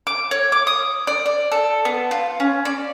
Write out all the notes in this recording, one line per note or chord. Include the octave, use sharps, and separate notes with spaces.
D6
C#5
D6
D#6
D5
D5
A4
B3
F4
C#4
D5